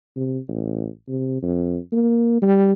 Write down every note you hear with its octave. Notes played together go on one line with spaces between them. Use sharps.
C3
A1
C3
F2
A#3
G3